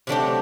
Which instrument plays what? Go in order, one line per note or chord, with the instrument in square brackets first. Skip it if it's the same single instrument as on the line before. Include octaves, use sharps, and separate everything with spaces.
[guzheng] C3 F#3 A3 D4 G4